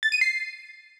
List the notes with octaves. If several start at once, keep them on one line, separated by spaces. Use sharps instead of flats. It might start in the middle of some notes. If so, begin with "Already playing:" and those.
A6
D#7
C7